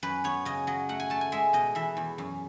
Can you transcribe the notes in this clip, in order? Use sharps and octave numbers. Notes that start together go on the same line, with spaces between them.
F#2 B4
B3 C#5
C#3 D#5
F#3 D#5
A3 F#5
G#5
A3 A5
G#5
G#3 E5
B2 D#5
E3 E5
E2
F#2